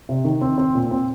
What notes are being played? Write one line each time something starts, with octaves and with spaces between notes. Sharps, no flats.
C3
D#3
C4
C4
A#2
C4